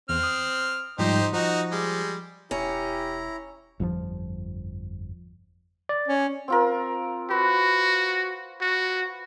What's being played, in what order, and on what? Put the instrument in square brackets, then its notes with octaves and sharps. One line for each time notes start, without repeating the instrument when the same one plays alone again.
[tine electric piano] E2 [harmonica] C4 F6
[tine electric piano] D#6
[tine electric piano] G#2 F3 G3 [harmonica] D#4 G4 C5
[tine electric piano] F3 [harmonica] D#4 F#4
[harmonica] G3 G#3
[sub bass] E1 [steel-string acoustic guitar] C#4 [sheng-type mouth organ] E4 A#5 [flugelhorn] G4
[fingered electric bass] G1 F2 B2 F3
[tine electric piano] D5
[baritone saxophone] C#4
[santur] C4 F4 A#4
[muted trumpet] F#4 [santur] B4
[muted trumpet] F#4